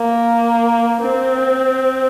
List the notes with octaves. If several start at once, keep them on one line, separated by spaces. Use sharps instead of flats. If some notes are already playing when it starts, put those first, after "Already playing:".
Already playing: A#3
C4